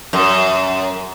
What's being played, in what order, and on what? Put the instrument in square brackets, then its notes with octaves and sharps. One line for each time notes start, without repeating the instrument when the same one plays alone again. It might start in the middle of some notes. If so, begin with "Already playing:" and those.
[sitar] F#2